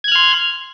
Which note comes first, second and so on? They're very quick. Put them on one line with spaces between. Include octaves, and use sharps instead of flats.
G#6 F#6 F6 C6